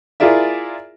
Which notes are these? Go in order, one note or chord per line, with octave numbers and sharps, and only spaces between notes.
E4 F4 G#4 A#4 D5 E5